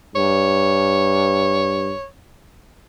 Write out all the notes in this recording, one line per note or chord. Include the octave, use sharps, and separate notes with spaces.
G2 C#5